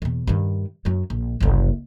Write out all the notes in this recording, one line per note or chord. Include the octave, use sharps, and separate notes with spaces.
E2 B2
G2 D#3
F#2 F#3
A#1
F#1 C2